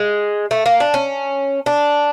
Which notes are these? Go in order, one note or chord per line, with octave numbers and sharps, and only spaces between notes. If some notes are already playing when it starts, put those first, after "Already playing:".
Already playing: G#3
A3
A#3
D4
C#4
D4